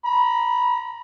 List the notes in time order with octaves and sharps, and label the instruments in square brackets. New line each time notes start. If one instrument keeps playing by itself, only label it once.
[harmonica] A#5 B5